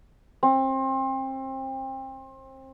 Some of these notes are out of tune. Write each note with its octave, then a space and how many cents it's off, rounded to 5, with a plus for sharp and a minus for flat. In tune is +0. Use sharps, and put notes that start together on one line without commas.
C4 +30